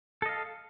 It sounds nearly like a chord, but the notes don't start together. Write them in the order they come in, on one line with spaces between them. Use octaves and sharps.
A4 D#5 F5